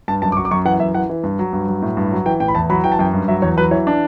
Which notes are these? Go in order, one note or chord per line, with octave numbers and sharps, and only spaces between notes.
G2 A5
F#2 A5
D6
F#3 C#6
D6
F#2 C#6
E3 F#5
F#2 E5
E3 F#5
E3
G2
F#3
G2
F#3
A2
G2
F#3
E3 G5
A2 G5
B5
E2 A5
F#3 B5
E3 G5
A5
F#2 G5
G2
F#3 E5
E2 C#5
F#3 B4
E3 C#5
D4